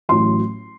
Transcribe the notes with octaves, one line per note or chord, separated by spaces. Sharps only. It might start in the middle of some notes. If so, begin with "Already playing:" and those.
A1 A2 F#3 C6